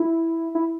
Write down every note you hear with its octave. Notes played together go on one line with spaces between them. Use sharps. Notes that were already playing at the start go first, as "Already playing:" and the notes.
Already playing: E4
E4